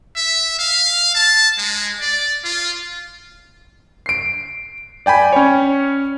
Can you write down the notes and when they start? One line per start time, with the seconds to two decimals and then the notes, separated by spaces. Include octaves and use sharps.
0.16 E5
0.59 F5
1.15 A5
1.58 G#3
2.01 D5
2.44 F4
4.06 C7 D7
5.06 D5 G5 G#5 B5
5.33 C#4 C#5